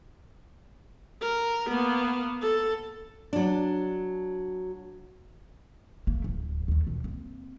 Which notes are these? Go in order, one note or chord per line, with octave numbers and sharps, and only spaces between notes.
A#4
A#3 B3
A4
F#3 D4
A3 A#3
D1
D#2 A3
B2 D#3
A#3 C4